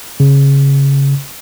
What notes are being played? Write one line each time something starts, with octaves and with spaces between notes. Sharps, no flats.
C#3